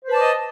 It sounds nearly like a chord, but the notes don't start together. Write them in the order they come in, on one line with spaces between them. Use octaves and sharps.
C5 B4 A5 D5 D#5